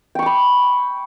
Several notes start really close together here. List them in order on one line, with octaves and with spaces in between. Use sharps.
G5 C#6 D6 B5